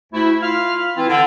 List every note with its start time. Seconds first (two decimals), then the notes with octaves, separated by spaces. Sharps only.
0.12 D2 A3 E4
0.42 F4 F5 B5 F6
0.96 E3 C4 E4 F4
1.09 D3